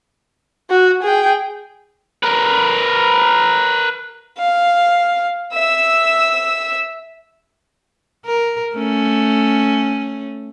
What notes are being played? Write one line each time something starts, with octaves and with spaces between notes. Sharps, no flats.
F#4
G#4 G5
A#4 B4
F5
E5 E6
A#4
A3 C#4